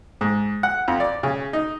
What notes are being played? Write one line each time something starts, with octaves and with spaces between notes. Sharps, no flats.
G#2
F#5
F2
D5
C#3
D#4